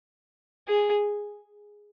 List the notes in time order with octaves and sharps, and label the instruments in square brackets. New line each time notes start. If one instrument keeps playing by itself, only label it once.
[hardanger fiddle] G#4